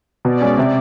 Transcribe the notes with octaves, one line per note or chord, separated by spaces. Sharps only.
B2 D5
G#3 C#4
C3